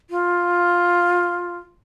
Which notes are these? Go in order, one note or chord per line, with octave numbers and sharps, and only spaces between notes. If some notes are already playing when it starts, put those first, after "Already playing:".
F4